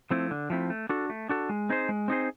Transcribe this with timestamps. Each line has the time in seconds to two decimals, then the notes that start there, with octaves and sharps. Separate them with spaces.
0.10 F3 A3 C4 E4
0.31 D3
0.50 F3 A3 C4 E4
0.70 A3
0.89 D4 F#4 A4
1.10 A3
1.29 D4 F#4 A4
1.49 G#3
1.69 C4 D#4 G#4 C5
1.89 G#3
2.08 C4 D#4 G#4 C5